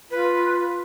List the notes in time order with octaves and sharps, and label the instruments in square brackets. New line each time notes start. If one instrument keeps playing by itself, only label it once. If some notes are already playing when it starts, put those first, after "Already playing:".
[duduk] F4 [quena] B4